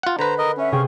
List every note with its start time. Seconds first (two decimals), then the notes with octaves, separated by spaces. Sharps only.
0.03 F4 F#5
0.19 D3 B4 C5 A#5
0.38 A#4 D#5
0.58 C#4 E5 F#5
0.72 C3 G#4 F5 G5 C#6